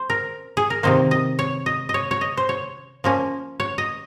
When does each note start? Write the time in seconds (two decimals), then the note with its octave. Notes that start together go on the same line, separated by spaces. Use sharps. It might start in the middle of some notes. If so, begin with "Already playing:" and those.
Already playing: C5
0.10 A#4
0.57 G#4
0.70 A#4
0.83 C3 D#3 A#3 C5
1.11 D#5
1.39 C#5
1.66 D#5
1.89 D#5
1.94 C#5
2.11 C#5
2.21 D#5
2.37 C5
2.49 C#5
3.04 F3 A#3 C#4
3.60 C#5
3.78 D#5